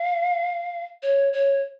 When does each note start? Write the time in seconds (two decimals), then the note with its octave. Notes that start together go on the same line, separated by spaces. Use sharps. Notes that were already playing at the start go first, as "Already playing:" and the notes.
Already playing: F5
1.03 C#5
1.33 C#5